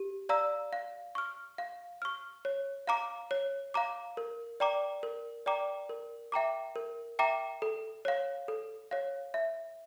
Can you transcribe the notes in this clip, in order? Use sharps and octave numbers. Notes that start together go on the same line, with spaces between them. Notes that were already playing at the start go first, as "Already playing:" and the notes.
Already playing: G4
D5 F5 A#5 E6
F5
C#6 F6
F5
C#6 F6
C#5
F5 A#5 D6
C#5
F5 A#5 D6
A#4
D5 G5 A#5 D6
A#4
D5 G5 A#5 D6
A#4
E5 G5 A#5 D6
A#4
E5 G5 A#5 D6
A4
C#5 F5
A4
C#5 F5
E5